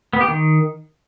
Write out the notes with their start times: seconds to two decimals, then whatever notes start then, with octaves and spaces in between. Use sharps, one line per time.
0.13 B3
0.21 G4
0.28 D#3